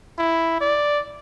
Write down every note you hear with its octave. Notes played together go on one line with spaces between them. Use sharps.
E4
D5